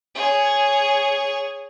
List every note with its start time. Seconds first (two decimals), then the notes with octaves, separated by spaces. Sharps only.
0.15 G#4 C#5